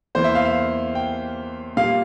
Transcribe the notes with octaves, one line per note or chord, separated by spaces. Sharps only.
E2 E3 A#3 C5
E5
F5
F5
G5
A#2 G3 A#3 F5